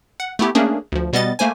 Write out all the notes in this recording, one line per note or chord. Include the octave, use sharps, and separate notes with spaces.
F#5
A3 B3 E4 G4
A3 A#3 C#4 D4 G#4 A#4
D2 F3
B2 G3 B3 D#5 A6
A3 A#3 C5 G#5